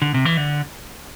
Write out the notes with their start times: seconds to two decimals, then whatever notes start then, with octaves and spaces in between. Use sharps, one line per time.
0.02 D3
0.14 C3
0.25 E3
0.37 D3